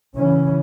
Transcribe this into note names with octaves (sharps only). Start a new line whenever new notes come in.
C#3 E3 C#4